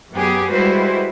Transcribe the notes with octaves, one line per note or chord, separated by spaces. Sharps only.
F#2 B3 G4 G#4
G3 G#3 E4 F#4 B4 C5